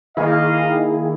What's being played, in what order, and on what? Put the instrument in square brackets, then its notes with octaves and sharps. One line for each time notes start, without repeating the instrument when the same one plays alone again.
[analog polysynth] D#3 A#3 [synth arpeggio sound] E4 G#4 [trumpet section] D#5 F5